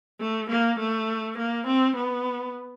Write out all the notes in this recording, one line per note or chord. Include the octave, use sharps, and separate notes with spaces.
A3
A#3
A3
A#3
C4
B3